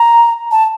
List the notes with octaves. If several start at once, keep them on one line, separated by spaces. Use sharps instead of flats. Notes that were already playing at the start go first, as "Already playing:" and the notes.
Already playing: A#5
A5